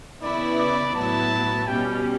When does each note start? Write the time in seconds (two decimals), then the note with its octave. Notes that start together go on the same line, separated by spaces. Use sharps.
0.22 C#3 E3 B3 E4 D5
0.59 D5
0.95 A2 F#3 B3 E4 A5
1.68 B2 G3 C#4 G5